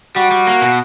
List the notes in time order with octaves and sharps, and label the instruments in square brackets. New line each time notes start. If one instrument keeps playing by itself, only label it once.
[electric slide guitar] G3 [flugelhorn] F#4
[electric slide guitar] G3
A#3
B2